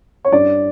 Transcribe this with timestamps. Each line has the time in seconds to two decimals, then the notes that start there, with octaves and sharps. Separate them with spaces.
0.24 C#5
0.32 G2 D5